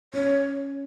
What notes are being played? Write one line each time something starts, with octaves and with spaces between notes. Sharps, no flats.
C#4 C#5